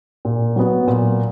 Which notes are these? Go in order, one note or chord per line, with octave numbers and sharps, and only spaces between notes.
A#2
F#3 B3
A#2